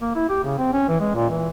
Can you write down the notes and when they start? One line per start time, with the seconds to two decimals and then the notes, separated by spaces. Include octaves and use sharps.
0.01 A#3
0.15 E4
0.29 G4
0.43 C#3
0.58 C4
0.73 C#4
0.88 E3
1.00 G#3
1.15 A#2
1.29 E3